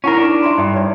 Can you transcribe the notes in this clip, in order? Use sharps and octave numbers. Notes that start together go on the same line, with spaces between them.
C#4 D#4 E4 A#4 F#5
D4
E5 A#5 C6
G2 E5 D#6
C#5 D5